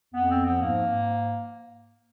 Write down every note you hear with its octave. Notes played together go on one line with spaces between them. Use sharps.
F2 B3
C4
F3
B3
G#2 A#3
G#2